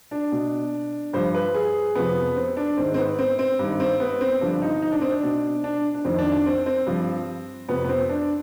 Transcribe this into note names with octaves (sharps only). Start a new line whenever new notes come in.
D4
B2
G2 F3 C5
B4
G#4
F2 C3 F3 B3
C4
D4
G#2 D#3 C4
C4
B3
C4
C4
G2 D#3
C4
B3
C4
G2 D3 F3 D4
D#4
D#4
D4
C4
D4
B2
D4
D4
F2 D#3 C4
D4
D4
C4
C4
G2 F3
F2 C3 F3 B3
B3
C4
D4